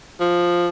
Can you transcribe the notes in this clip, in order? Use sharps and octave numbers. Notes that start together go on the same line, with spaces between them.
F3